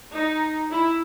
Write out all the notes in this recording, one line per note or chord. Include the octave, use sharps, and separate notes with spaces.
D#4
E4